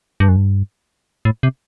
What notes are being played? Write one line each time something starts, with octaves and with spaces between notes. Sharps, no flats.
G2
F#2
G2
A2
C3